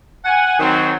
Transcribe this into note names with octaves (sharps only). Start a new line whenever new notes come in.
F#5 G#5
D#3 F#3 C4